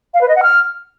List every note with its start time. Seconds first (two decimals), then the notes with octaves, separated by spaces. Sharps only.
0.14 F5
0.21 B4
0.28 D#5
0.36 F#5
0.43 F6